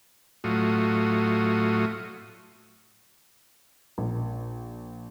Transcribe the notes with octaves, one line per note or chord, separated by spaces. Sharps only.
A2 F#3 A3 F4 F#4 D#6
A#1